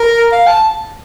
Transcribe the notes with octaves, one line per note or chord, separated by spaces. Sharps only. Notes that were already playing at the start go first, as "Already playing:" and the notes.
Already playing: A#4
F5
A5